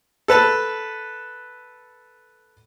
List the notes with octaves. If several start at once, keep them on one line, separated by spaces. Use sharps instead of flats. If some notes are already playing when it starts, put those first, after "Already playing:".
A4 B4 A5